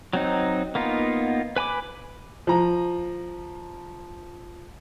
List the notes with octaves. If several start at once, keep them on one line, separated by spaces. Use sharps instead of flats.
F#3 C4 D#4
A#3 B3 D#4 F4
B4 G#5 B5 D6
F3 A#5